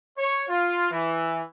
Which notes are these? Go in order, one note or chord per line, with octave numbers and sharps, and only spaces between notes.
C#5
F4
E3